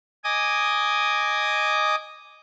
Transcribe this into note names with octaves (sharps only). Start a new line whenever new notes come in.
D#5 G#5 D6 D#6